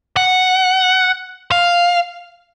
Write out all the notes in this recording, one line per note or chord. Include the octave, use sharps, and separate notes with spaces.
F#5
F5